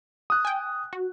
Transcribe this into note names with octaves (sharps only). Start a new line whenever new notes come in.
D#6 F#6
G5 G#5
F#4